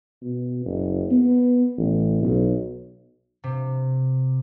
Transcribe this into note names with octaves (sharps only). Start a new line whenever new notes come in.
B2
F#1
B3
A1
B1
C3